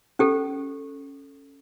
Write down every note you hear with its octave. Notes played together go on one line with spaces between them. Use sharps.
C#4 G4 A4